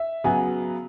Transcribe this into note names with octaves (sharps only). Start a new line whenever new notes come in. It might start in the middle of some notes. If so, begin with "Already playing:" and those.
Already playing: E5
C#3 F#3 B3 G#5